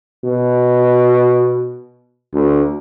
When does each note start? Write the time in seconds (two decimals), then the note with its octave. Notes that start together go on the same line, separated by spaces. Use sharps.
0.25 B2
2.34 D2